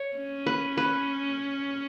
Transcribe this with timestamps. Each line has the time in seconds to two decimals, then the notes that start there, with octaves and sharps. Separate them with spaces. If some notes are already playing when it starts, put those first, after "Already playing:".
Already playing: C#5
0.17 C#4
0.46 B4
0.77 B4